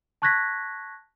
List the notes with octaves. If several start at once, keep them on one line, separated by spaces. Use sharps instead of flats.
A5 C#6 F#6 G#6 A#6 B6